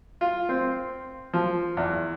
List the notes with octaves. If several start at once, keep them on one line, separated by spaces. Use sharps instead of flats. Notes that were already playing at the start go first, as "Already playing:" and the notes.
F4
C4
F3
E2